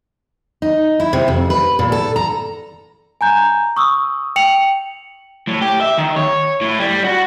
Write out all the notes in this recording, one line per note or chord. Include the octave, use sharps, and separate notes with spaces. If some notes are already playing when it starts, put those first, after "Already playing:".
D#4
E4
C3
F2
B4
A#2
A4
A#5
G#5 A#5 G6
C#6 D#6 E6
G5 C#7 F7 F#7
A2
G4
E5
D#3
C#5
A2
G3
F#4